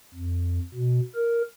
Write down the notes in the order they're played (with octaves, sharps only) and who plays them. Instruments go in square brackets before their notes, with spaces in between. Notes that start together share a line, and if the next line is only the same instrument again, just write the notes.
[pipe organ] F2
B2
A#4